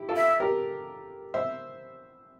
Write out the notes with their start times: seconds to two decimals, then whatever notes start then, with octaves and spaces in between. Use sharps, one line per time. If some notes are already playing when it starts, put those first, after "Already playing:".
Already playing: E4 G4
0.09 F4 A4
0.16 E5
0.40 G4 A#4
1.34 C5 E5